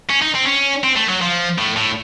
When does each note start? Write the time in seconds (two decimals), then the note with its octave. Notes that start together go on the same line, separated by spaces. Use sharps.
0.10 C#4
0.22 D#4
0.35 C4
0.46 C#4
0.84 C4
0.96 A3
1.09 F#3
1.21 F3
1.58 A2
1.76 A2